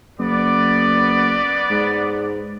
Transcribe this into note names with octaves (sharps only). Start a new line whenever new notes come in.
F#1 B3 D5
G#2